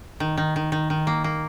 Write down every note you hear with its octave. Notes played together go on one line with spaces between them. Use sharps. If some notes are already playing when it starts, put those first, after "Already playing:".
D#3
D#3
D#3
D#3
D#3
A#3
A#3